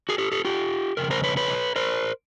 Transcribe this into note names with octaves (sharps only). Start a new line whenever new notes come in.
F#4 G#4
G4 A4
G4 A4
F4 G4
F2 C#3 A#4
A#4 C5
B4 C#5
B4 C#5
A#4 C5